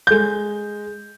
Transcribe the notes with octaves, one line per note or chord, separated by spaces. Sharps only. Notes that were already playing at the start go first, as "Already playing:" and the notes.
G#3 G6